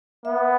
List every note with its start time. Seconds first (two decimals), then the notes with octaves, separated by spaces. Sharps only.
0.25 B3 E5